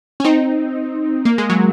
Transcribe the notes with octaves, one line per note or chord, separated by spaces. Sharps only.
C#4
C4 D#4
A#3
G#3
F#3